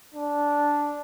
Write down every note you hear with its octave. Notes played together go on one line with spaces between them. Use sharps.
D4